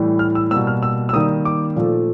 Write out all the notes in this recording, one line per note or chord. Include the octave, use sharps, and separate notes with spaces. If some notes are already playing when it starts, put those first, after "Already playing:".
Already playing: A2 E3 G3
F6
E6
B2 G3 A#3 E6
F6
E6
E6
D#3 G3 A#3 D#6
D6
A#2 F3 A3